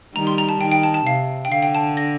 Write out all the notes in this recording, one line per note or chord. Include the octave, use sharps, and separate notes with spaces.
D#3 G3 A#5
C6
A#5
A5
D#3 G5
G5
A5
A5
C3 F5
G5
D3 F5
G5
A5
A#6